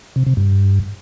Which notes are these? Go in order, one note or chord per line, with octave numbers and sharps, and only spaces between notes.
C3
C3
G2